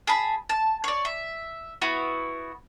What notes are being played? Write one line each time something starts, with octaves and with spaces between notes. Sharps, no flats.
G#4 A5 B5
A5
C#5 D5
E5
B3 E4 F#4